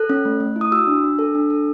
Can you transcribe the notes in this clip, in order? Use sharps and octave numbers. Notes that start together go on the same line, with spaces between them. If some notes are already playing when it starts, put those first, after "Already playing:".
Already playing: A4 F#6
C#4
A3
A3
E4
D#6
F#4 E6
D4
D4
A4
D4
A4